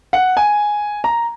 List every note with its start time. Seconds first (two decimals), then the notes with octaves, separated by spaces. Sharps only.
0.13 F#5
0.37 G#5
1.04 A#5